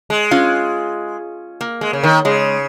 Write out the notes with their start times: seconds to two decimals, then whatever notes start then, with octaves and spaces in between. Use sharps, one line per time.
0.10 G#3
0.31 C#4 F4
1.61 A#3
1.81 G#3
1.93 C#3
2.03 D#3
2.25 C#3 G#3